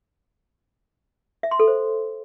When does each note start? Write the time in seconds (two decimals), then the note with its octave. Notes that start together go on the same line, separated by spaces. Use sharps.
1.43 E5
1.51 C6
1.60 A4
1.68 C5